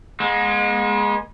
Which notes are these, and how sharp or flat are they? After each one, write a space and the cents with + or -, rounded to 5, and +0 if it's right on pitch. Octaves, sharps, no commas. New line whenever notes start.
G#3 +0 B3 -45